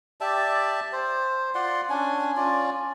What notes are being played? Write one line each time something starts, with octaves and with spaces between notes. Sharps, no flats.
G4 D5 E5 A5
C5
F4 D5 F#5 C6
C#4 D4 G#5
C#4 F4 D5